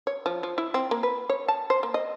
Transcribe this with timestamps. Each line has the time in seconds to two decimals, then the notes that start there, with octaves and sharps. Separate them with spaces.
0.07 C#5
0.26 F3
0.43 F3
0.58 E4
0.74 C4
0.91 A#3
1.03 B4
1.29 C#5
1.48 A5
1.70 C5
1.83 A#3
1.94 D#5